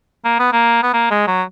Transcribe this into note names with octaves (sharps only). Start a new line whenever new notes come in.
A#3
B3
A#3
B3
A#3
G#3
F#3